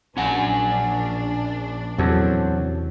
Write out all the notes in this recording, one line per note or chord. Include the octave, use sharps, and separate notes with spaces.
A#1 C#4 D4 F#5 G#5
E2 C3 F#3 A4